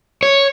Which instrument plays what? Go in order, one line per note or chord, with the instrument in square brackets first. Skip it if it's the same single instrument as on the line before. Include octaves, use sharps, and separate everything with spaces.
[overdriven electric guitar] C#5